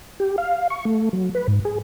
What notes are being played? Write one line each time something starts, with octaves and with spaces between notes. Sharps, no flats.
G4
F5
C#6
A3
F#3
B4
G#2
G#4